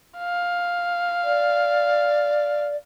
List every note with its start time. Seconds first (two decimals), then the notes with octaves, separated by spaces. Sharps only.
0.18 F5
1.23 D5